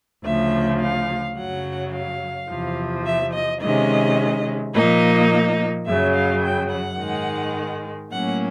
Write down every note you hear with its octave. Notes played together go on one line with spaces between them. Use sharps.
D2 C#3 F3 E5
F5
F#2 C#3 F#3 F#5
F5
E2 C3 F3
E5
D#5
C3 D#3 G#3 C#4 D#5
A#2 F3 A#3 D#4 D#5
F#2 C#3 F#3 E5
F5
G5
F#5
G#2 D#3 G#3
A2 F#3 A#3 C#4 F#5